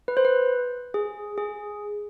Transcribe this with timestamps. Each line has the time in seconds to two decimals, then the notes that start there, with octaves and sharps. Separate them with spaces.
0.08 B4
0.17 C5
0.25 B4
0.94 G#4
1.38 G#4